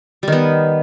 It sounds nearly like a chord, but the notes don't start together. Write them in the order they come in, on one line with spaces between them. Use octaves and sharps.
G3 D#3 B3